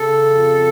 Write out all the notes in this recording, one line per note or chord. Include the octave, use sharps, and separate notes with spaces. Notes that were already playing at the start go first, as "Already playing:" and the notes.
Already playing: C#3 A4
F2